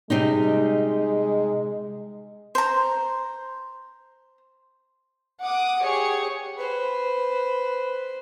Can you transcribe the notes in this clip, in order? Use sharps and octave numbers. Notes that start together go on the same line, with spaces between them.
C3 G3 G#3 D#4
C5 A#5
F#5 D6 D#6
G4 G#4 C#5 C#7
B4 C5